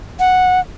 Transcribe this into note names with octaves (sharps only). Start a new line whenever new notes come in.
F#5